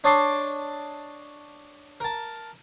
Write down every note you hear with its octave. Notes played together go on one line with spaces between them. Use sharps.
D4 C#5 D#5 A5 C6 D6
A#4 A5